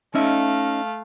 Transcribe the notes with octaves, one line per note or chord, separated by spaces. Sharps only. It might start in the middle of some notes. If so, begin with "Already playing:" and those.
A3 C#4 D#4 E5 F5